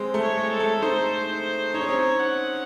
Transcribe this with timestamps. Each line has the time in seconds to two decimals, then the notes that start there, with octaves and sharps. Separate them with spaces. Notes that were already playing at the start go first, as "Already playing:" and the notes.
Already playing: G#3 C4
0.14 A3
0.22 C#5
0.37 G#3
0.52 A4
0.60 A3
0.82 C4 D#4 C5
1.74 D#4 C#5
1.81 C#4
1.88 C4 D#4
2.19 F#5